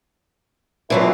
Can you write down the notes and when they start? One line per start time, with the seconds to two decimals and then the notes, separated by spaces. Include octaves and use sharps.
0.90 B2 D3 E3 F#3 F4